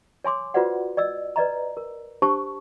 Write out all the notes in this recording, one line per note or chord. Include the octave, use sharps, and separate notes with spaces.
C#5 G#5 C6 D6
F4 F#4 B4 C5 D5 F#5
D5 D#5 E6
B4 D5 D#5 A#5
A#4
D4 G4 C5 A5 C#6